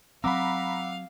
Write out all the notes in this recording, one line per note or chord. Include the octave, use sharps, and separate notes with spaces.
F#3 C4 F5 F#5 A#5 B5 D6 E6